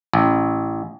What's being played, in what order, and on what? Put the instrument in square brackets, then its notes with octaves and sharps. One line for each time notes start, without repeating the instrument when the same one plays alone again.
[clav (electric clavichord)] A1